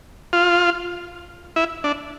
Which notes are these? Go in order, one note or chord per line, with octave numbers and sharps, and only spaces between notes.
F4
E4
D4